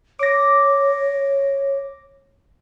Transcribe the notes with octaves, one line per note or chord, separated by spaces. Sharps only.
C#5 D6 A#6